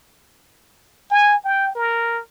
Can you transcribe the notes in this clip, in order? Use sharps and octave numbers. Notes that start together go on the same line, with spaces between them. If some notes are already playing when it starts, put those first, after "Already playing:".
G#5
G5
A#4